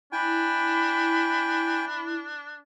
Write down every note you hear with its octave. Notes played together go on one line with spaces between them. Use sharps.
D4 E4 G5 G#5 B5